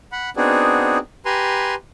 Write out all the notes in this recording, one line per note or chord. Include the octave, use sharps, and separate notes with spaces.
F#5 B5
B3 C4 D4 D#4 F#4 G#4
G4 B4 G#5 A#5 C6